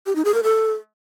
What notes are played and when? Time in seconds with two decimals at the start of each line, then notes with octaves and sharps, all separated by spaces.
0.06 G4
0.16 D#4
0.25 G#4
0.34 A#4
0.43 A4